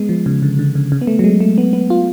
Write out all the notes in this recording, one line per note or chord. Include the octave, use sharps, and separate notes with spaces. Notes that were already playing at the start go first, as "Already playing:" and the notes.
Already playing: G#3 B3
F3
C#3
D3
D3
C#3
C#3
B3
A3
F#3
G#3
A3
B3
B3
F4